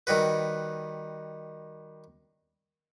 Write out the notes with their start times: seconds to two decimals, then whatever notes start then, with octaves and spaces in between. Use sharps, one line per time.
0.07 D#3 G3 F#4 B4